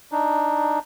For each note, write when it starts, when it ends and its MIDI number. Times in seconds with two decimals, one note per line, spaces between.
0.12 0.79 62
0.12 0.79 63